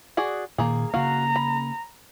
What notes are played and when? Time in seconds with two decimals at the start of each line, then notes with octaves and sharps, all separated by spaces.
0.17 F#4 G#4 D5
0.58 A#2 D#3 A#3 G#4
0.94 C#3 A#3 F#4 F5 A#5
1.36 B5